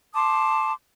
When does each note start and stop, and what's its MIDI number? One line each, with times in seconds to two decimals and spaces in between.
0.14 0.73 81
0.14 0.73 84
0.14 0.73 86
0.14 0.73 87